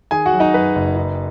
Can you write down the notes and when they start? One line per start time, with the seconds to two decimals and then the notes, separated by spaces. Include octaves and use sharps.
0.11 D#3 G#4 G#5
0.26 F#4 F#5
0.33 F#3
0.40 D#4 D#5
0.54 F#2 B4
0.75 F#1
0.97 D#4